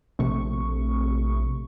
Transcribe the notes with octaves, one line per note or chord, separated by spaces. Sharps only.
A#1 C3 A3 C#6